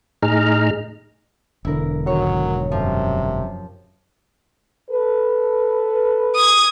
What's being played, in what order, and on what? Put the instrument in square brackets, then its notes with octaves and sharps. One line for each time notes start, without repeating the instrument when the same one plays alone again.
[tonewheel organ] A2 D#4 G#4 A#5 F6
[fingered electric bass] E1 D3 [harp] E4 A#4
[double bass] G#2 D#3 [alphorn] F#3 [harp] C#5
[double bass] F#2 [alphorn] C3 [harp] F3
[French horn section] A4 B4
[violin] D#6 G#6